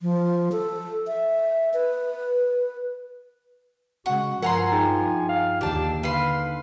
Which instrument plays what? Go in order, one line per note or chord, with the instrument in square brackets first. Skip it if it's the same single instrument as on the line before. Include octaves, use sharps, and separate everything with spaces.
[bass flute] F3
A4
E5
B4
[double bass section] C#3 G#3 [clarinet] F#4 [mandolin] F#5
[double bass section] G2 F3 [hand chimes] A#4 [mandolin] F#5 A#5 C6 [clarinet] G#5
[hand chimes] D#4 G#4 G5
[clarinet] F5
[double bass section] D#2 D3 [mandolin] D4 A5 [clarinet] G4
[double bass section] D3 [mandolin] B4 C6 [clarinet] F5